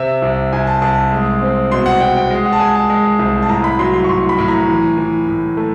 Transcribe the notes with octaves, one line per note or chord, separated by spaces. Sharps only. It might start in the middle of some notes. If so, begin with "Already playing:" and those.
Already playing: C3 E5
C2
C2 G#5
A5
C2 A5
G#3
C4
B2 C6
F#5
B2 G5
G5
G#3
F#5
A5
G#3 G#5
A5
G#3
C2
A5
A2 A#5
B5
F#3 C6
C6
C#6
A2 C6
B5
A2
A#5
E3
E3
A2
A3